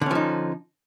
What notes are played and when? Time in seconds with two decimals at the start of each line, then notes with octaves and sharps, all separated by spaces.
0.01 D3
0.06 C#4
0.11 F3
0.15 D#4